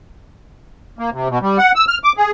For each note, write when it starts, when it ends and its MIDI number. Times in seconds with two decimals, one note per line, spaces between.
0.99 1.10 58
1.13 1.28 48
1.30 1.39 47
1.42 1.58 55
1.58 1.72 78
1.76 1.85 88
1.88 1.98 89
2.04 2.13 86
2.17 2.31 68